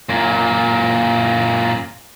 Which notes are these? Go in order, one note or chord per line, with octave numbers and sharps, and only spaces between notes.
F#2 A#2